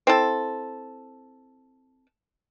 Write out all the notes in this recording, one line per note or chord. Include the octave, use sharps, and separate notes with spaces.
C4 E4 A4